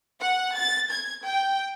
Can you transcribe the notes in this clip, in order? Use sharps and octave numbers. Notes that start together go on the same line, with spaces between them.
F#5
A6
G#6
G5